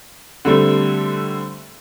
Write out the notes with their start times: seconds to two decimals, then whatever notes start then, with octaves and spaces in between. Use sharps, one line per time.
0.45 D3 G3 A3 C4